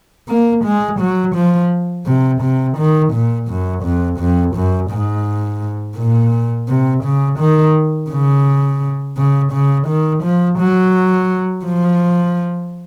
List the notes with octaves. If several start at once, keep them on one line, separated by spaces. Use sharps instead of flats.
A#3
G#3
F#3
F3
C3
C3
D#3
A#2
F#2
F2
F2
F#2
G#2
A#2
C3
C#3
D#3
C#3
C#3
C#3
D#3
F3
F#3
F3